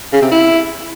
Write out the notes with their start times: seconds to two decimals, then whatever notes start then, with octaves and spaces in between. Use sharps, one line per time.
0.13 C#3
0.22 C3
0.32 E4